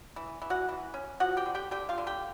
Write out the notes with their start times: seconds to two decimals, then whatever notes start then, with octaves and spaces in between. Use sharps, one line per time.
0.16 E3
0.42 E3
0.50 F#4 F#5
0.69 E3
0.94 C#4
1.20 F3 F#4 F#5
1.37 G4 G5
1.46 D3
1.55 G4 G5
1.71 D3 G4 G5
1.89 F4 F5
1.98 D3
2.07 G4 G5